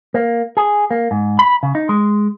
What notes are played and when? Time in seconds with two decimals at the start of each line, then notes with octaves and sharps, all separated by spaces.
0.14 A#3
0.57 G#4
0.91 A#3
1.11 G#2
1.39 B5
1.63 C#3
1.75 D#4
1.89 G#3